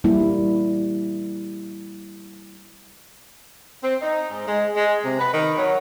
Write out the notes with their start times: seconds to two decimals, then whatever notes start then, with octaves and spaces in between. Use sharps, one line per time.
0.04 G3 A#3 E4
3.82 C4
4.02 D#4
4.30 G#2
4.47 G#3
4.76 G#3
5.05 C3
5.19 B4
5.33 D#3
5.58 F#3